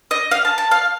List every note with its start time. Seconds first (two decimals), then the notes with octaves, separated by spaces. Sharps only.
0.11 D#5
0.31 F5
0.45 A5
0.58 A5
0.71 F5